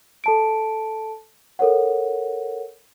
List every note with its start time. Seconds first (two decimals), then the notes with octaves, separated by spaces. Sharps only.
0.24 A4 A5 D7
1.59 A4 A#4 C#5 F#5